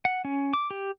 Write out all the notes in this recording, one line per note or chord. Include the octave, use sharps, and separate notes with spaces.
F#5
C#4
D6
G4